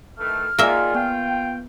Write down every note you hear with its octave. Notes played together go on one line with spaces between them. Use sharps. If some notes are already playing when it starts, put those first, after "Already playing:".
D#3 E3 A3 F6
D#3 A#3 F4 G#4 D5 E5 G#5
B3 F4 G5